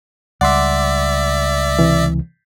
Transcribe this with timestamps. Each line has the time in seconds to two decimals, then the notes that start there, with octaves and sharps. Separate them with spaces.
0.41 C#2 G3 D5 E5 F#5 C6 D6
1.79 C3 E3